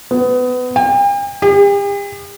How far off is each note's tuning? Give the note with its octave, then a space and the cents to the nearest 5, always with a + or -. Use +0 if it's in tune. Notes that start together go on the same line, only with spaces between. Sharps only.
B3 +25
G5 +45
G4 +45